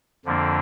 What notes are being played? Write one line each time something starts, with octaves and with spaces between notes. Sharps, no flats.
F2 D3 F3 A#3 D4